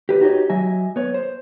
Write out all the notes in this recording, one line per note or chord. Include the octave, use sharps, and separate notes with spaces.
G4 B4
D#4 F#4 G4 A#4 C#5 D#5
F#3 D#5 E5 G#5
B3 C#5
C5